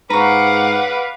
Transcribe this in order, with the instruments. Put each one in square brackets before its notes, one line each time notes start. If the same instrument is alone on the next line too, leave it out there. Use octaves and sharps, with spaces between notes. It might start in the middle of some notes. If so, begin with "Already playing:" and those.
[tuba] G#2 [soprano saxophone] B4 [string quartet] F5 F#5 D6 [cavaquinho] A#5 C#6